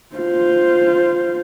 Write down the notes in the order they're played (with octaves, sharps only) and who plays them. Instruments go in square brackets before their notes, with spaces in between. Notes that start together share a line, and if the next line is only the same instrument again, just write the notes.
[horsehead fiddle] F4 C5